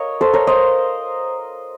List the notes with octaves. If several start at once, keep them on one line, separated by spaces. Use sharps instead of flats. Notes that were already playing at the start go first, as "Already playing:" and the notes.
Already playing: A#4 C#5 D#5 F5
A4 C5
A#4 C#5
C5 D#5